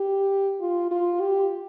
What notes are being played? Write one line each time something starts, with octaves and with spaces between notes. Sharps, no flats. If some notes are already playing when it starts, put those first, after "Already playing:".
Already playing: G4
F4
F4
G4